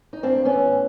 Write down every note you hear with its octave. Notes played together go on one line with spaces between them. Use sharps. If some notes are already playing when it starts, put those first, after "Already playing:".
D#4
G2 C4 D4
G2
B3 C#4
E3
A2